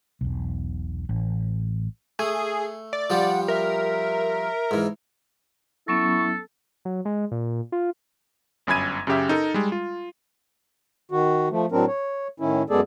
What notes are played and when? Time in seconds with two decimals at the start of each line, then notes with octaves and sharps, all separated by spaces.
0.21 E1 B1
1.09 A1
2.19 A3 G#4
2.93 D5
3.10 F3 G3 G4 F#5
3.48 A#4 E5
4.71 G#2 E3
5.88 F#3 B3 C#4 E4 A4 C#6
6.85 F#3
7.05 G#3
7.32 A#2
7.72 F4
8.67 G1 F#2 G#5 B5 G#6 D#7
9.07 F#2 C#3 C#4 G4 E5
9.29 D#4 A4 A#4
9.54 G3 G#3
9.72 F4
11.11 D#3 F#4
11.51 F3 A3
11.72 A2 F#3 C4 D4 A#4
11.88 C#5
12.40 A2 D#3 C#4 E4
12.70 F#2 G#3 B3 G#4 A4 D5